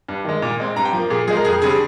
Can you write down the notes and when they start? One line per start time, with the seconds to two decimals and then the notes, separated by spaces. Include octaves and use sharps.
0.08 G2
0.25 D#3 G#3
0.42 A#2
0.60 G#3 C4
0.76 G2 A#5
0.85 G5
0.93 F3 A#3
1.10 A#2 G#4
1.28 F3 G#3 G#4
1.37 A#4
1.45 F2 G#4
1.62 D3 G3 C4 G#4